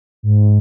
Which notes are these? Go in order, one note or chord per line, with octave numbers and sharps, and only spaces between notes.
G#2